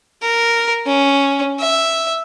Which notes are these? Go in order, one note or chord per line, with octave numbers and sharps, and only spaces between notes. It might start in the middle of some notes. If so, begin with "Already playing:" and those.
A#4
C#4
E5